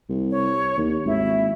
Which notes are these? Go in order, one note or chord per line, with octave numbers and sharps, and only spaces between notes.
C2
C#5
D#2
G#1 E4